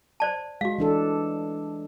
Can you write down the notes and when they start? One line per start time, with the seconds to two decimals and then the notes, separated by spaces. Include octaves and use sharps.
0.20 C5 D5 A5
0.61 G#3 F#4 F5
0.78 E3 D4 A4